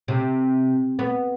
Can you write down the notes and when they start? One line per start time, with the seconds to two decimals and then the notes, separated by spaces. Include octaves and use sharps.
0.08 C3
0.99 B3